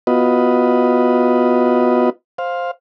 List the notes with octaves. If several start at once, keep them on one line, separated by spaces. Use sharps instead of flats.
B3 F4 F#4 B4 D#5
C5 F5